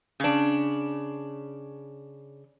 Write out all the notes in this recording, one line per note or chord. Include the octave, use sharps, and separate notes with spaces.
C#3 D4